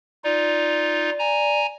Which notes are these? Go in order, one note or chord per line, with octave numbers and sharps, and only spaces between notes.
D#4 F4 D5
G#5 A#5